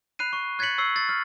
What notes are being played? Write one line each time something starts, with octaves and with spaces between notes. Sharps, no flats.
B5 F#6 C7 D#7
C#6
F#6 G#6 A6 B6 C#7 F#7
C#6 E6 C7
A6
F6